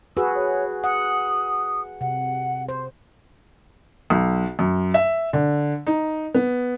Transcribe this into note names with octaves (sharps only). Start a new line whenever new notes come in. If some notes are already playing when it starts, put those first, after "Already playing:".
F#4 G#4 B4 E6
C#5
F#5 D#6
C3 F#5
C5
B1
F#2
E5
D3
D#4
B3